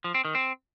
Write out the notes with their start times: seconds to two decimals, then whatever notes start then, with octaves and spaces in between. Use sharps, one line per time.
0.04 F3
0.15 C4
0.25 D#3
0.35 C4